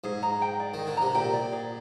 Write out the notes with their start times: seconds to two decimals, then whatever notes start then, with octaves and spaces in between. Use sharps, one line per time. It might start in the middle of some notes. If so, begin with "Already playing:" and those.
0.04 G#2 G#4
0.23 A#5
0.42 G5
0.60 D5
0.74 D#3 G#4
0.87 D3
0.97 C3 A#5
1.15 A#2 G5
1.33 D5
1.52 G#4